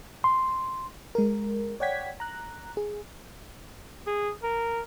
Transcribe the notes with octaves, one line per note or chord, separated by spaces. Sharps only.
C6
G#3 A#4
C#5 D5 F#5 G5 G#6 B6
A#5 F#6
G#4
G#4
A#4